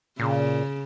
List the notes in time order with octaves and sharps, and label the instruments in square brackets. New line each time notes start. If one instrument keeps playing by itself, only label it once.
[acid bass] A#2 [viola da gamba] C#3